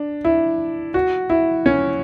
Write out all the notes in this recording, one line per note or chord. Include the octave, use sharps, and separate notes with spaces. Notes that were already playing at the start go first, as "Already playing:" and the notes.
Already playing: D4
E4
F#4
E4
C#4